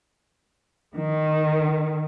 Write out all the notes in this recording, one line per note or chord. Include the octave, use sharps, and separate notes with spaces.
D#3